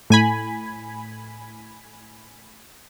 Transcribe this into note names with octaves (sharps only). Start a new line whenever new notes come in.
A2 G#5 B5